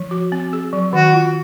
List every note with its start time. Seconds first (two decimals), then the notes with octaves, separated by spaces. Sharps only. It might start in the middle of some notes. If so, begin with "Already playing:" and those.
Already playing: F3
0.11 F#4
0.32 C4
0.53 G#4
0.73 F#3
0.93 D#3 F#4
1.13 F4